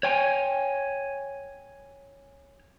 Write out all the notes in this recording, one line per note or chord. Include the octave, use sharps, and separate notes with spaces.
C#5 G5 G#5